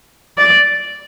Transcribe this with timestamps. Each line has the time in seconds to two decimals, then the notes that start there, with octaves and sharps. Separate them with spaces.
0.38 D5